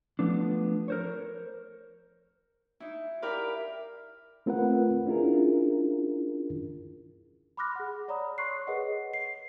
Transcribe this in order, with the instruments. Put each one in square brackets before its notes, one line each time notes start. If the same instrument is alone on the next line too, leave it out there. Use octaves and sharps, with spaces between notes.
[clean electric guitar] F3 A3 B3 D4
A#4 C5 C#5
[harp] D#4 E4
E4 G4 A#4 D5 F5 B5
[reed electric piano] A3 C4 F4 A#4 B4 F#5
C#4 D4 E4 F4 G#4 A#4
[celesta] B5 C6 D6 F6 F#6 A#6
G#4 F#5
C#5 D5 A#5 B5 D#6
C#5 C6 C#6 F#6 C7
G#4 A#4 B4 C#5 D#5 F#5
C7